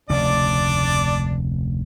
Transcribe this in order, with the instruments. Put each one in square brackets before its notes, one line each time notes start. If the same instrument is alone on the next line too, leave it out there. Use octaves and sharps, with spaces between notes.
[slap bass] F1 D2 C#3 [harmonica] D4 D5